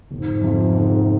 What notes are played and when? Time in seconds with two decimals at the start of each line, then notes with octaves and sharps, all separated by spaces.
0.11 F1 G#2
0.41 F2 C3 F3
0.72 F1
1.04 C3